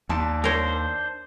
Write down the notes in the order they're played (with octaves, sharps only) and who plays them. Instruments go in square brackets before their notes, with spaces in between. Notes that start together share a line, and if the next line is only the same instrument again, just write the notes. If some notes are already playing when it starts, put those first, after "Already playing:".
[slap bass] D#2 [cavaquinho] D5 A5 C6
[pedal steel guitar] D4 C5 [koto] A#4 C#5